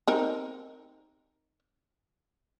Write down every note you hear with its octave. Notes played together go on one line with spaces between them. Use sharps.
C4 D#4 A#4